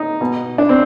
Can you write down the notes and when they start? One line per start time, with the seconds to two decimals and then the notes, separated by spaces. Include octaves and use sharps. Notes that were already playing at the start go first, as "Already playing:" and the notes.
Already playing: D#4
0.21 B2
0.58 D4
0.69 C4